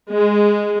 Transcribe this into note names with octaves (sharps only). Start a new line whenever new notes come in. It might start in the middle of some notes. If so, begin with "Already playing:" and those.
G#3